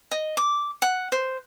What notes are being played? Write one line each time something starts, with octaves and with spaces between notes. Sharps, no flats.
D#5
D6
F#5
C5